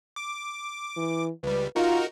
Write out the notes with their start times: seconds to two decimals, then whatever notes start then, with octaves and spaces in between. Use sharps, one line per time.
0.16 D6
0.96 E3
1.43 C#2 G3 B4
1.76 D#4 F4 F#4 A#4